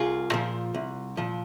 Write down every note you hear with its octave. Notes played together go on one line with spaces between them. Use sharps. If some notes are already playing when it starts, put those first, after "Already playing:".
Already playing: C2 F4 G#4
A#2 F3
C2
A#2 F3